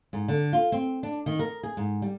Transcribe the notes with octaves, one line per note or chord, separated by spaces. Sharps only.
G#2
D3
F4
C4
D4
D#3
A#4
G#4
G#2
G3